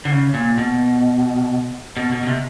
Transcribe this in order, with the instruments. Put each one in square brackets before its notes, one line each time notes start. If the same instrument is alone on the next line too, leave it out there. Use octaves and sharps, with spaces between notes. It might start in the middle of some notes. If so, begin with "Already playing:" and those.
[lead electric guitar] D3
C#3
A#2
B2
B2
B2
B2
C3